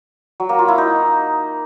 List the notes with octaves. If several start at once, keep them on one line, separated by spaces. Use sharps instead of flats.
F#3
A#3
F4
E4
D#4